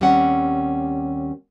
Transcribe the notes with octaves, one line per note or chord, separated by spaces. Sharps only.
D#2 G3 C4 C#4 F#5